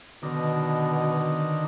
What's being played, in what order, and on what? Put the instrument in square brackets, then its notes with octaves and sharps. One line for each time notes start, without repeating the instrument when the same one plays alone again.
[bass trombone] B2 [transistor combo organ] D3 D#3